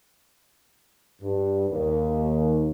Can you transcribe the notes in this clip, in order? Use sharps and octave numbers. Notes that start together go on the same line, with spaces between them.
G2
D#2